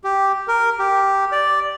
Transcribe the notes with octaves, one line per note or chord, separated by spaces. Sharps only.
G4
A#4
G4
D5